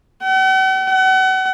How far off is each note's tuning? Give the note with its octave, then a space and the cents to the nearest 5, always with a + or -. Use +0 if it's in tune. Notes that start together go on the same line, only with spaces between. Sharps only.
F#5 +45
F#5 +35